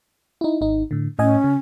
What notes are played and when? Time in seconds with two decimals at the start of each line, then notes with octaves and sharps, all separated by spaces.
0.41 D#4 E4
0.61 G#1 D#4
0.91 A2 D3
1.19 A2 C#4 D#5 G#5
1.44 C#3